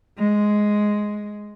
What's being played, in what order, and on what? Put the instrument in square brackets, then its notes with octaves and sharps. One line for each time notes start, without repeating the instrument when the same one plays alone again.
[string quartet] G#3